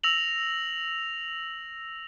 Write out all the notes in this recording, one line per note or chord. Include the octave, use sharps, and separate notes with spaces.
E6 A#6 F7 F#7